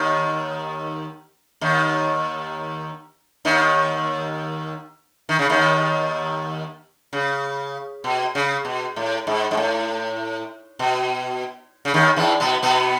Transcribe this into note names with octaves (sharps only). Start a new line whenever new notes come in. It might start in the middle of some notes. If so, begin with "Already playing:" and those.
Already playing: D#2 D#3
D#2 D#3
D#2 D#3
D#3
C#3
D#2 D#3
C#3
B2
C#3
B2
A2
G#2
G#2
A2
B2
C#3
D#2 D#3
E2 E3
B2 B3
B2 B3